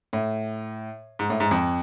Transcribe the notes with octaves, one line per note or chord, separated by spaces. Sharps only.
A2
G#2
A2
G#2
F2